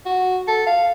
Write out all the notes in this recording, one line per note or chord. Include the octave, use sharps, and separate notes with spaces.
F#4
A4
F5